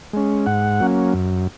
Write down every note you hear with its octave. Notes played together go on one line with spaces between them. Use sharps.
G#3 C#4
G#2 F#5
F#3 A#3 C#4
F#2